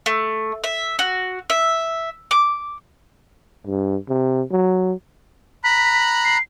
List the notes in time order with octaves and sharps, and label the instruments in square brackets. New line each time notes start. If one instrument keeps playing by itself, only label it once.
[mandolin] A3
E5
F#4
E5
D6
[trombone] G2
C3
F#3
[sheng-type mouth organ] A#5 B5 F#6 [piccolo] B6
[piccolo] C7